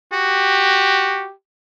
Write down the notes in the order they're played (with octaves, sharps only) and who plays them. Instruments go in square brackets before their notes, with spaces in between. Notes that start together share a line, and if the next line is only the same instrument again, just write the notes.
[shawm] F#4 [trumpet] G4